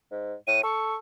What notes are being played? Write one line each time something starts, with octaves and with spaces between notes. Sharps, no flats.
G#2
A2 D#7
A4 C#6